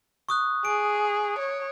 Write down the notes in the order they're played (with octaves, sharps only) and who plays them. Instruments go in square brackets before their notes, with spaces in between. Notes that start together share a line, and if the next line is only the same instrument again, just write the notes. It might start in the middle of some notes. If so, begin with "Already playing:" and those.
[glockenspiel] C#6 D#6 F#6
[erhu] G#4 [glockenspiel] D7
[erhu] C#5